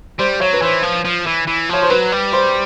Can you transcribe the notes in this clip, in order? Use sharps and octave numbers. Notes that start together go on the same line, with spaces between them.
G3 C5
F#3 C#5
B4
E3 C5
F3
F3
E3
E3
F3 C#5
C5
F#3 B4
G3
C5